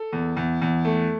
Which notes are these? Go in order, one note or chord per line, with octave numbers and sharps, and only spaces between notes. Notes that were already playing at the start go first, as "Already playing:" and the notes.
Already playing: A4
E2
E2
E2
A3